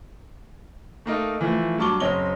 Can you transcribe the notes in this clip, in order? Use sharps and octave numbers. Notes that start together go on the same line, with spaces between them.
A3 A#3 D#4 A4
E3 F3 A3
G2 F#3 A5 C#6 D6 G7
F#1 C4 C#5 D#5 G7